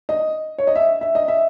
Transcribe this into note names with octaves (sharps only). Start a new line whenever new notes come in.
D#5
C#5
D#5
E5
E5
D#5
E5